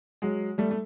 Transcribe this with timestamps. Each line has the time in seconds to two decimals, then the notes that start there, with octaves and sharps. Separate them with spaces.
0.22 F#3 G#3
0.58 G3 A3
0.71 A3